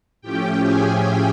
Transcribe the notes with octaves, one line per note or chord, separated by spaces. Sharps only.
A2 F3 A3 C#4 G4 G5
G#4 G#5